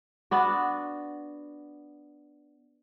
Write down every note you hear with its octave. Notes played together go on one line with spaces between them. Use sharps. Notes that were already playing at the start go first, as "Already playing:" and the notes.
B3 D4 F#4